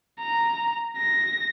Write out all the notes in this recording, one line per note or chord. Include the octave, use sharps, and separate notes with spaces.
A#5
A#6